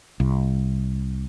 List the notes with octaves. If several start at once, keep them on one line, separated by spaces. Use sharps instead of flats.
C2